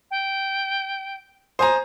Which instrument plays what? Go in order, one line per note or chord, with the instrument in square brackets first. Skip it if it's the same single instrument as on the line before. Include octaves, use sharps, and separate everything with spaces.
[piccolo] G5
[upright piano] C5 G#5 A#5 [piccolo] D#6